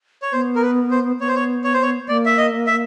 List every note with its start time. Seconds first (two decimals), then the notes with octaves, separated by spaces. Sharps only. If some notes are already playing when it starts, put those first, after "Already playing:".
0.22 C#5
0.32 B3 C5
0.56 A#4
0.62 B4
0.91 C5
1.20 B3 C#5
1.28 C5
1.35 C#5
1.64 C#5
1.74 C5
1.82 C#5
2.08 A#3 D5
2.26 E5
2.38 D#5
2.67 E5